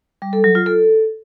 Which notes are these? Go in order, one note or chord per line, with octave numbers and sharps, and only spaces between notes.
G3
A4
F#3
F4
A4